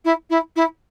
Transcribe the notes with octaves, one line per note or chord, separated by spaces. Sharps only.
E4
E4
E4